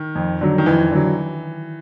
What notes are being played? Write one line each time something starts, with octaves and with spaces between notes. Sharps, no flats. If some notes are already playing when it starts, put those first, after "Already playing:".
Already playing: D#3
F2
D3 F#3
D#3
F2 E3
D3 F#3